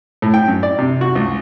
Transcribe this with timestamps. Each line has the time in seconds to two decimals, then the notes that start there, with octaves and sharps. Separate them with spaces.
0.22 A2
0.34 G5
0.48 F#2
0.63 D5
0.79 C3
1.01 F#4
1.15 C#2